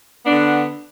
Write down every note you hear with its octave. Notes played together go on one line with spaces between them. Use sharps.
D3 B3 D4